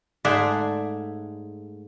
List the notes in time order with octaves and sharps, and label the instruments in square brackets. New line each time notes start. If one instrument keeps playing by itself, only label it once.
[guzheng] G#2 A3 G#4 D5 F#5 C6